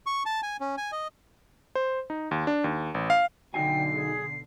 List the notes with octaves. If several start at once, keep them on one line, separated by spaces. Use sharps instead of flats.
C#6
A5
G#5
C#4
G#5
D#5
C5
D#4
D#2
D4
D#2
A1
F5
B1 D3 D#4 F#4 G5 G#5 C7
G#4